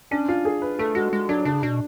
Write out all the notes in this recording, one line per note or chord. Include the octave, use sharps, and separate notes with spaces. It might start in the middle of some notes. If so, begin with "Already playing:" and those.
C#4 D4
F4
G#4
B4
A3 A4
G#3 F#4
G#3
F#3 D4
C#3 D4
B2 D4